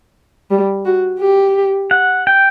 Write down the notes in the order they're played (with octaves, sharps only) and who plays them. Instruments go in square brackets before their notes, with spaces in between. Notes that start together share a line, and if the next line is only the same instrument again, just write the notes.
[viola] G3
F#4
G4
[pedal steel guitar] F#5
G5